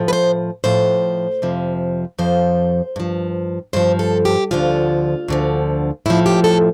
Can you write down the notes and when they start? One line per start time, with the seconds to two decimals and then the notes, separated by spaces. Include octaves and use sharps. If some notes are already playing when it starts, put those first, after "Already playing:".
Already playing: A2 F3
0.08 B4
0.13 C5
0.64 A2 F3 C5
1.42 F2 C3 F3
2.19 F2 C3 F3 C5
2.96 G2 F3
3.73 G2 F3 C5
3.99 A4
4.25 G4
4.51 D2 D3 F3 F4
5.28 D2 D3 F3
6.06 A2 F3 E4
6.26 G4
6.44 A4